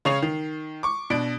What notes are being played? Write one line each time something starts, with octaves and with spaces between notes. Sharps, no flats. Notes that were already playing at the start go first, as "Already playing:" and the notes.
C#3 C#4 C#5 C7 F7
D#3
C#6 D6
B2 D4 D7